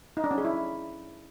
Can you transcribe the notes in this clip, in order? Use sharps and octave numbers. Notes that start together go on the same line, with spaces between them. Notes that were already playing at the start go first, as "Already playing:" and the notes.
D#4
D4
C#4
G#4
E4